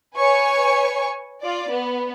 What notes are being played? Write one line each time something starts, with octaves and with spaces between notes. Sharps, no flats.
B4 C#5 G#5 C#6
F4 D5
B3